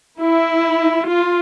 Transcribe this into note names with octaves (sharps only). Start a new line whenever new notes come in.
E4
F4